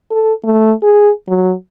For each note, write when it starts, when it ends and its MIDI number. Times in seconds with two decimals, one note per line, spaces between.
0.11 0.33 69
0.44 0.72 57
0.83 1.10 68
1.28 1.53 54